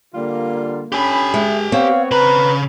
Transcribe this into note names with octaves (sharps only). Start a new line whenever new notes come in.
D3 G3 A#3 F4
C#4 D4 G4 G#5 B5
G#3 E5
B3 C4 C#5 F5
C#3 B4 A#5 B5